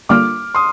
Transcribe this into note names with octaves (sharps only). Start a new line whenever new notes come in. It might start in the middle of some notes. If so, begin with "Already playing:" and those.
D3 G3 A#3 F4 D6 F6
C6 D#6